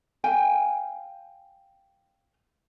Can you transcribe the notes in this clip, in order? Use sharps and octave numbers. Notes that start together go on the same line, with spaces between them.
F5 G5 G#5